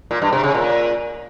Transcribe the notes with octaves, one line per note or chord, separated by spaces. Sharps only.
A#2
G2
C3
C#3
A#2